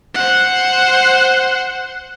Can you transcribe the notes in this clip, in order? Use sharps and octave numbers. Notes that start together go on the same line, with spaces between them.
C5 F#5